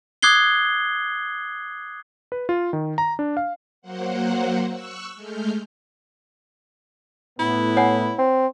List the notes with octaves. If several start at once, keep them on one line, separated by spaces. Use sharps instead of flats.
D6 D#6 F#6 G#6 C7 G7
B4
F4
D#3
A#5
D4
F5
F#3 A#3 C5 F#5
C#6 E6 F#6
G#3 A3 F6 G6
A2 B3 E4
C#5 F#5 G#5
C4